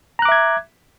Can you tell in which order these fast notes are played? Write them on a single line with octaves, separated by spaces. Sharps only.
A#5 F#6 D6 E5 G#6